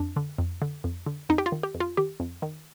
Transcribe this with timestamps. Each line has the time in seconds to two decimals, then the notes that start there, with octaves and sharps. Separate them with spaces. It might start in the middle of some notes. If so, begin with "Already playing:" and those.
Already playing: F2 D4
0.16 D3
0.39 F2
0.62 D3
0.84 F2
1.07 D3
1.29 F2 D#4
1.38 G4
1.46 F4
1.52 D#3
1.63 G4
1.75 F2
1.80 F4
1.97 D#3 G4
2.20 F2
2.42 D#3